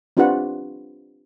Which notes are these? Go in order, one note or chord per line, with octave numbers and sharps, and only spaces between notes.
C4 D4 F4 G4 B4 F#5